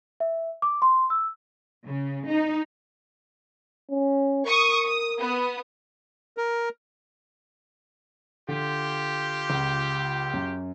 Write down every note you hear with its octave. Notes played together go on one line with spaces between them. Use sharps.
E5
D6
C6
E6
C#3
D#4
C#4
A#4 C#6 D#6
D#6
B3 D#6
A#4
D3 F4 G4
C#2
F#2